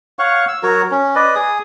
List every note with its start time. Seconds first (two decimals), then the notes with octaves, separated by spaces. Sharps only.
0.19 C#5 F5 F#5 C#6
0.48 E6
0.63 F#3 F#4 A#4 C#5
0.91 C#4
1.15 B4 D5 D#5
1.35 G#4 D#6